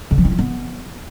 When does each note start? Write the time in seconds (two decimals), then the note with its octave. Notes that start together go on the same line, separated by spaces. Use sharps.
0.11 D3
0.18 F3
0.25 C#4
0.32 F4
0.39 B3